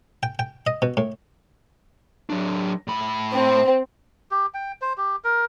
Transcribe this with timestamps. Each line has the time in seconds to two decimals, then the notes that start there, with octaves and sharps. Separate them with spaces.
0.23 G5
0.39 G5
0.67 D#5
0.82 B2
0.97 A2
2.30 F#3 D4
2.88 A2 B5
3.32 C4
4.31 G4
4.54 G5
4.81 C5
4.97 G4
5.24 A#4